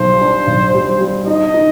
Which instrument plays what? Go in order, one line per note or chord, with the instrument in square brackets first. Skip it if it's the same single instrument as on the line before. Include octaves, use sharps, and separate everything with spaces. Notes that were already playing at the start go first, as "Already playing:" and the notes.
Already playing: [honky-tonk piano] B1 G3 [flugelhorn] C5
[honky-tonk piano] D4
B1
G3
G3
[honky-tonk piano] D#4 [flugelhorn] D#5
[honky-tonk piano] D#4